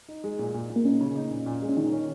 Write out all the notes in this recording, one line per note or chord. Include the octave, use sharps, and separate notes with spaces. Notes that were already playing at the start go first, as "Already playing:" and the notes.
D#4
G#3
A#2
A#2
A#2
A#3
C#4 D#4
C#3
D#4
A#2
A#2
G#3
C#4
D#3 D#4
C#4